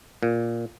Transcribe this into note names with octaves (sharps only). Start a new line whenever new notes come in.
A#2